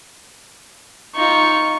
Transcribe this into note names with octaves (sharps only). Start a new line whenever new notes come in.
D#4 F4 C#6